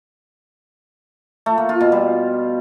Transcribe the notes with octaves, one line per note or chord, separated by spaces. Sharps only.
A3
A#3
F4
B2
G3